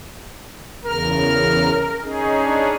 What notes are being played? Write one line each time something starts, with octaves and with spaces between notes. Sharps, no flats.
E2 C#3 A#4 F6
C#4 D#4 G#4
D4